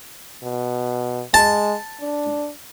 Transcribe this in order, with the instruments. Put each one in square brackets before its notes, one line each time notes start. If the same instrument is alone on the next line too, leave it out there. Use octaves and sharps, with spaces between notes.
[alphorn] B2
[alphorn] G#3 [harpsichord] A5
[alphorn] D4